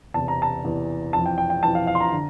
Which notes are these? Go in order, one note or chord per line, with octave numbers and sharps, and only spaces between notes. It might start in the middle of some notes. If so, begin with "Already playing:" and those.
E2 C3 E3 A5
A#5
A5
E2 C3 E3
F2 E3 A5
G5
G5
G5
F2 E3 A5
F5
F5
C6
A#5
D3